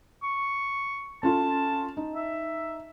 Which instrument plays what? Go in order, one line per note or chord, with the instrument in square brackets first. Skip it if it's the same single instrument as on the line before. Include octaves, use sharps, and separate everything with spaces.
[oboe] C#6
[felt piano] C#4 F4 A4 [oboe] A5
[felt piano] D#4
[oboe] E5